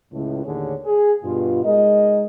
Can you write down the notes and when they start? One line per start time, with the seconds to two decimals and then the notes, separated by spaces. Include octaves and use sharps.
0.12 C#2 A2
0.45 D#2 A2 D3 D4 G#4 C#5
0.85 G#4
1.24 G2 B2 F4
1.64 G#3 D#4 G#4 A#4 D#5